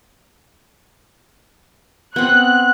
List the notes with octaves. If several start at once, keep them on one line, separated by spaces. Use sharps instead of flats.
B3 C4 F#6